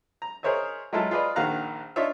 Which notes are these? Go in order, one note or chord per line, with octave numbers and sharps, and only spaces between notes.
A#5
G#4 A#4 C5 C#5 D#5 E5
F#3 G#3 E4 F4 A4 A5
F4 G#4 B4 D5 D#5
A#1 D#3 F#4 F5 A#5 F#6
D4 D#4 F4 C#5 E5